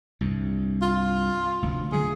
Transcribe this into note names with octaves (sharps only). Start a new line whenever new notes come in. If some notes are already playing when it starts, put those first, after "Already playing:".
C2 G2
F4
F1 D2
D3 F#3 A3 G#4